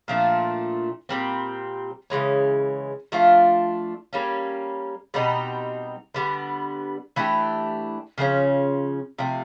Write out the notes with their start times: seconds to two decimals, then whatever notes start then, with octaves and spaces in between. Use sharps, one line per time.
0.08 A#2 F3 A3 D4
1.09 A#2 G3 C4
2.10 C#3 E3 G#3 C#4
3.12 F3 A3 D4 F4
4.13 G3 A#3 C#4
5.14 B2 G3 C4 D#4
6.14 D3 G3 B3
7.16 E3 A3 D4 G4
8.18 C#3 F3 A3 C#4
9.18 C3 F3 A3